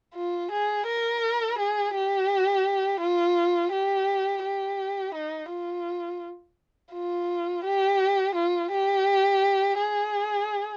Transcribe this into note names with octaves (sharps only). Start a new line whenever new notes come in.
F4
G#4
A#4
G#4
G4
F4
G4
G4
D#4
F4
F4
G4
F4
G4
G#4